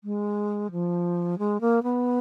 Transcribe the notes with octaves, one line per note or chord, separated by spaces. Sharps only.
G#3
F3
G#3
A#3
B3